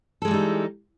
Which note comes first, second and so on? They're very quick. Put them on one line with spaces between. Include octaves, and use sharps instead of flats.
A4 G#3 E3 G3 D#4